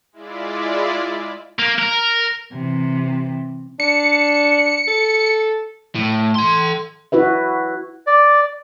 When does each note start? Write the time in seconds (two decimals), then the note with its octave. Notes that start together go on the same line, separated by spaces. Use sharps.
0.12 G#3 E4 F4 D5
1.59 A#3
1.78 A#4
2.53 C3 E3
3.80 D4 C#7
4.88 A4
5.95 A2
6.35 A4 C6
7.12 E4 F#4 B4 E5
8.07 D5